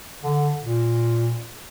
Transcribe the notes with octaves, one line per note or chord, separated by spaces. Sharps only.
D3
A#2